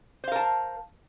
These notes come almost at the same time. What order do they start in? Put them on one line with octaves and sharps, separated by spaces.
C5 F5 A#4 A5